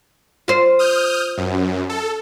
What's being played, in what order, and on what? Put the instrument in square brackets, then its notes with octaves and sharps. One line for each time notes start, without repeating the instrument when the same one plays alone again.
[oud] F4 C5
[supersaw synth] D#6 F6 G6
F#2
A4